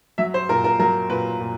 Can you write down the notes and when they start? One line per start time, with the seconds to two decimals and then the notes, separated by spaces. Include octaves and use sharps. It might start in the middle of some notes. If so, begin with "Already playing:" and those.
0.18 F#3 E5
0.34 C5
0.49 A#2 A#4
0.64 A#4
0.79 F#3 A#4
1.10 A#2 B4
1.40 A#2